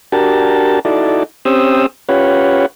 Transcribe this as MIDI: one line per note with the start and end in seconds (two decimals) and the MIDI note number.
0.12 0.79 62
0.12 0.79 66
0.12 0.79 67
0.12 0.79 70
0.12 0.79 81
0.85 1.23 63
0.85 1.23 64
0.85 1.23 66
0.85 1.23 69
0.85 1.23 74
1.45 1.86 60
1.45 1.86 61
1.45 1.86 67
1.45 1.86 72
1.45 1.86 87
1.45 1.86 88
2.09 2.66 61
2.09 2.66 65
2.09 2.66 67
2.09 2.66 71
2.09 2.66 73
2.09 2.66 78